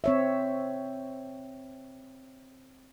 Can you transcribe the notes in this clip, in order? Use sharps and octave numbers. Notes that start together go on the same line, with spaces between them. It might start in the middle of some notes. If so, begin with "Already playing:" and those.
C4 C#5 E5